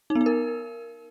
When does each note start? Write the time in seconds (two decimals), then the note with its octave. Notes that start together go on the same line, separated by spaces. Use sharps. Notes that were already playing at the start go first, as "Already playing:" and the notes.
0.10 D#4
0.15 B3
0.21 D#4
0.26 A#4